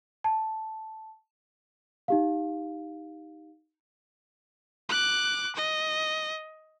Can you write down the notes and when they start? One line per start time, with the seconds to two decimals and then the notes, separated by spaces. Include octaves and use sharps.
0.24 A5
2.08 D#4 G4 F5
4.89 D6 F#6
5.56 D#5